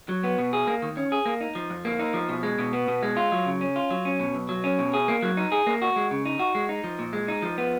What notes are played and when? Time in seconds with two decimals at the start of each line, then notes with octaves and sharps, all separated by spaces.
0.09 F#3
0.24 B3
0.38 B2
0.53 G#4
0.67 A#3
0.82 D#3
0.97 C#4
1.12 G#4
1.26 A#3
1.41 D#4
1.55 F3
1.70 F2
1.85 A#3
1.99 D#4
2.14 F3
2.29 B2
2.43 G#3
2.59 B2
2.73 B3
2.88 B2
3.03 G#3
3.17 F4
3.32 F#3
3.46 C#3
3.61 C#4
3.76 F4
3.91 F#3
4.05 C#4
4.19 B2
4.35 B1
4.49 F#3
4.64 C#4
4.79 B2
4.93 G#4
5.08 A#3
5.22 F#3
5.37 D#4
5.52 G#4
5.67 A#3
5.82 F#4
5.96 G#3
6.11 C#3
6.25 D#4
6.39 F#4
6.55 G#3
6.69 D#4
6.84 F3
6.99 A#2
7.13 G#3
7.28 D#4
7.42 F3
7.58 B3